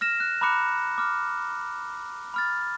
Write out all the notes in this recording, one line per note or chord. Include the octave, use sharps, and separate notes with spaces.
F6 A#6 E7
F#6
A#5 B5 D6 F#6 C#7
D6 F6
B5 F6 A6